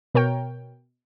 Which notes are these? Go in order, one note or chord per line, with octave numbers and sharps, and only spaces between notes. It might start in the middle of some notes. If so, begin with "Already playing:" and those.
B2 A#4 C#5 G5